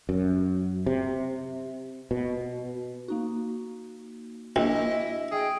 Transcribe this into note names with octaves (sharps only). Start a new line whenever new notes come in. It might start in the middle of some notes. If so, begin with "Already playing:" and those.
F#2
C3
B2
A#3 D#4 F#4
A#1 D4 E4 F#4 D#5
G#4 G5